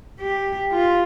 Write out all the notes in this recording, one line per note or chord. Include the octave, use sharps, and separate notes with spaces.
G4
F4